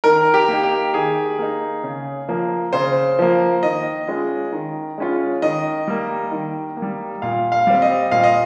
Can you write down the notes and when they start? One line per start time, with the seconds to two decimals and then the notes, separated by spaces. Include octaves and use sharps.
0.04 D#3 A#4
0.34 G4
0.48 A#3 D#4
0.63 G4
0.94 D#3 G#4
1.39 A#3 D#4
1.84 C#3
2.29 F3 A#3
2.73 C#3 C5
3.19 F3 A#3
3.63 D#3 D#5
4.07 G#3 C#4 F4
4.53 D#3
4.98 G#3 C#4 F4
5.42 D#3 D#5
5.88 G3 A#3
6.32 D#3
6.77 A#3
6.82 G3
7.22 A#2 F5
7.52 F5
7.67 G3 C4
7.82 D#5
8.11 A#2 F5
8.24 D#5